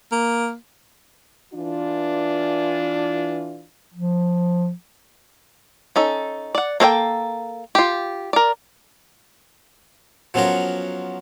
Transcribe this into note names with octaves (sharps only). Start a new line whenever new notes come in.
A#3
E3 D4 F4
F3
C#4 D#4 A4
D5 F#5
A#3 A4 C5 G5
F4 G4
A#4 D5
F3 F#3 B3 C#4 F4 A#4